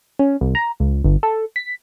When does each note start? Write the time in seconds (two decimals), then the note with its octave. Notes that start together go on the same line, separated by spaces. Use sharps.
0.19 C#4
0.41 C2
0.55 A#5
0.80 C#2
1.04 G1
1.23 A4
1.56 B6